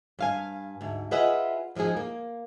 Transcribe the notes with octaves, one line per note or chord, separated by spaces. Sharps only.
G2 F5 G#5
D2 G#2
F4 G#4 B4 D#5 E5 F#5
F#2 F3 G#3 D#4 G#4
A#3